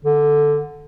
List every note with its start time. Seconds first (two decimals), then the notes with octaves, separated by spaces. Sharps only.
0.05 D3